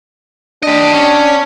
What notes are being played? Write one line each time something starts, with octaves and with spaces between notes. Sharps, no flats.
D4 G4 D#5
C#4